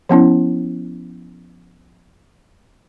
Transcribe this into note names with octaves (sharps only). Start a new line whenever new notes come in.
F3 B3 C#4 E4